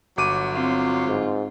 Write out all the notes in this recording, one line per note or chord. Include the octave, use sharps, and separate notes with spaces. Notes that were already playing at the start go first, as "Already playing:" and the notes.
G1 F#3 D6 D#7
C4 F4
G#2